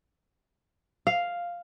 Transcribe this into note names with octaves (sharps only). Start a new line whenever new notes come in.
F5